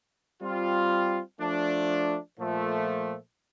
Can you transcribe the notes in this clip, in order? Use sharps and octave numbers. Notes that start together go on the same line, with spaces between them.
G3 C4 F4
F3 A3 D4
A#2 F3 A3